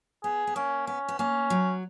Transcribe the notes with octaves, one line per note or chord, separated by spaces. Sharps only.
B3 G#4
B3
A#3 C#4
B3 C#4
B3
A#3 C#4
F#3